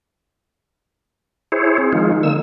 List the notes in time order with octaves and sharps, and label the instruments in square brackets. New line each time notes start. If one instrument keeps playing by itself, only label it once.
[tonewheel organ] E4 G#4 C5 C#5
C4 G#4
D#3 F3 G#3 D#4 F4
D3 D#3 A#3 E6